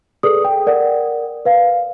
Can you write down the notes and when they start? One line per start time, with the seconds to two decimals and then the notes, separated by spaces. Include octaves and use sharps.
0.23 G#4 A4 B4 D5 D#6
0.45 G5
0.67 A#4 D5 F#5
1.45 B4 F5